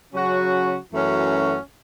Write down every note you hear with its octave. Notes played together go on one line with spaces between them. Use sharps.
C#3 F#3 C#4 F#4
F#2 E3 A3 C#4 F#4